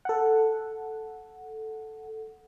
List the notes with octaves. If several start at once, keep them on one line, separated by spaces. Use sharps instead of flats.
A4 F#5